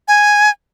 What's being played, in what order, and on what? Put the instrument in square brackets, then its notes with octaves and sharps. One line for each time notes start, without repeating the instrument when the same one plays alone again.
[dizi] G#5